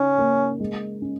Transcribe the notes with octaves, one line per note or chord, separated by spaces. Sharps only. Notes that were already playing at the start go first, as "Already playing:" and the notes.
Already playing: C#3 C#4 D#4
A#3
G#3
C#4